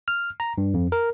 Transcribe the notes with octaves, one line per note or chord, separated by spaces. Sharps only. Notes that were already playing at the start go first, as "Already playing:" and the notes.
F6
A#5
G2
F2
A#4